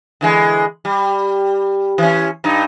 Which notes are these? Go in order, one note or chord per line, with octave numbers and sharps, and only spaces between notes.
D3 E3 G#3
G3
E3 C#4
G2 D#4